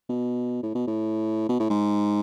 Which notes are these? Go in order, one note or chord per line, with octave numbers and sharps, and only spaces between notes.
B2
A2
B2
A2
B2
A2
G#2